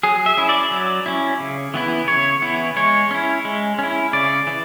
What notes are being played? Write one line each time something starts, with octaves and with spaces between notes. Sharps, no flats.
F#3 G#4
E5
C#4 E4
D5
F#3
C#4 E4
C#3
E3 B3 E4
C#3 C#5
E3 B3 E4
G#3 C#5
C#4 E4
G#3
C#4 E4
C#3 D5
E3